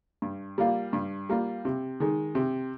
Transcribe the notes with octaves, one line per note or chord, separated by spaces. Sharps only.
G2
G3 A#3 F4
G2
G3 A#3 F4
C3
D#3 G#3
C3